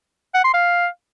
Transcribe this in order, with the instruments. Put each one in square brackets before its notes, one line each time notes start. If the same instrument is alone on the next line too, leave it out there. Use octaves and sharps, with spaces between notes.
[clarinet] F#5
C6
F5